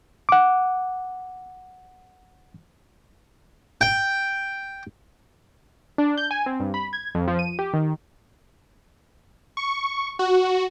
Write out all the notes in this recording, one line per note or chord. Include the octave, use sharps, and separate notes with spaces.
F#5 D6
G5
D4
G6
G#5
C4
G2
B5
G#6
F2
F3
D#7
G4
D#3
C#6
F#4